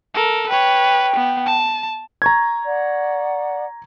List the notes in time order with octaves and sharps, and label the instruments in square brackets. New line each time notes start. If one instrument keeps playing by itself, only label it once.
[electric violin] A4 A#4
[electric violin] B4 C#5 [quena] G5
[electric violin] B3
A5
[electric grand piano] A#5 C#6 G#6
[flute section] D5 F#5